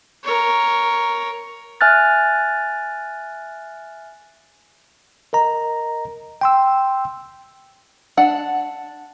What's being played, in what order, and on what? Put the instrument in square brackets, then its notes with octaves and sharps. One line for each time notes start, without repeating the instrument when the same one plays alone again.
[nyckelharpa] A#4 C#5
[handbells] E5 G#5 F6 F#6 A6
[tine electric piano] A#4 D#5 A#5
G5 C6 E6
[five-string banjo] D4 F#5